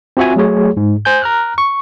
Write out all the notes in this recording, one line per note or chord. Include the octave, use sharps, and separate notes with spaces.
C4 F4 F#4 E5 G#5
F#3 A3 G#4 C#5
G#2
C5 G#5 G6
A#5 F6 F#6
C#6